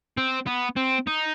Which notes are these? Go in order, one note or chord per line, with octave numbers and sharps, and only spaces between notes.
C4
B3
C4
D#4